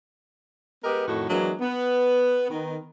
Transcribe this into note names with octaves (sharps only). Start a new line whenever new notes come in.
G#3 B3 G4 A#4 B4 D#5
F2 A2 D#3 F#4
E3 F#3 G#3 A#3 D4
B3
D#3 B3